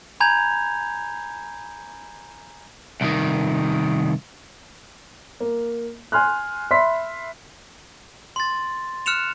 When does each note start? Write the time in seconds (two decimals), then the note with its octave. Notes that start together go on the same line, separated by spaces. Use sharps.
0.20 G#5 A#5 B5 G6 G#6 F7
3.01 C2 D#3
5.40 A#3
6.12 G#5 C6 F6 F#6
6.71 E5 B5 C6 B6
8.36 C6 A6
9.06 F6 F#6 C#7 E7 F7